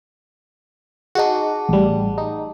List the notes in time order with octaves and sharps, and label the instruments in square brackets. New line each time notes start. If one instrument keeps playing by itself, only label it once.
[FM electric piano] D#4 F#4 [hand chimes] G#4 F#5 A5
[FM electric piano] A1 G3
D#4